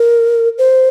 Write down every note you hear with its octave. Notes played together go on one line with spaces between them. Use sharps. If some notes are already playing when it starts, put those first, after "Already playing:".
Already playing: A#4
C5